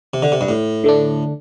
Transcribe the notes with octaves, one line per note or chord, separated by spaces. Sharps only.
C3
D3
C3
G2
A2
D3 A3 D4